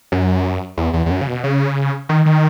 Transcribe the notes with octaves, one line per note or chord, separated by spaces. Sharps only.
F#2
E2
E2
E2
F#2
C#3
B2
C#3
D#3
D#3